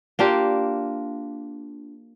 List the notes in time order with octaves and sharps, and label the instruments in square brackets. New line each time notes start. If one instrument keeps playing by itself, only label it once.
[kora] A#3 D4 F4 G4